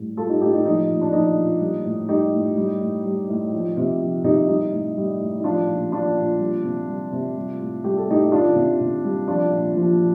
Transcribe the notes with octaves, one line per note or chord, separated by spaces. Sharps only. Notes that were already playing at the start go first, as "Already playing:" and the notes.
Already playing: A2 G3
G3 F4 A4
D#4 G4
A2 D#4 G4
D#4
F3 D#4
A#2
D4
F3 D#4
A#2
G3
A2
G3 D#4 G4
A2
G3
A2
G3
A2
F3
C3
F3
C3 D#4 G4
G3 D#4
A2
G3
A2
D#4
F3 D4 F4
A#2
F3 D4 F4
A#2
G3
C3
G3
C3
G3
A2
G3 G4
A4
A2 D#4 G4
D#3 D4 F4
C3
C3
G3
F3 D4 F4
A#2
F3
A#2